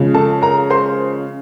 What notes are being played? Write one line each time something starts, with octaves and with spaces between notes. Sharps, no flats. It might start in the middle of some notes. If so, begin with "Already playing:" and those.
Already playing: C#3 F3 G#3
A4 A5
A#4 A#5
C5 C6